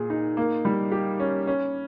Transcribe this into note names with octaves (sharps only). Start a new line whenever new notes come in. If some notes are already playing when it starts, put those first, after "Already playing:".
Already playing: A#2 G#4
D#4
A#3
G3
G4
C#4
C#4